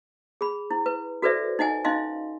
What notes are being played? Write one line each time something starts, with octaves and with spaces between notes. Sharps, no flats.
G#4 B5
E4
B4
F#4 A4 B4 C5 D5 E5
D#4 D#5 F#5 G#5
C#4 D#4 D#5 F5 C6